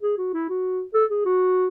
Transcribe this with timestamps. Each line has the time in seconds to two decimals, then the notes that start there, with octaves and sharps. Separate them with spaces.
0.02 G#4
0.18 F#4
0.34 E4
0.49 F#4
0.94 A4
1.10 G#4
1.25 F#4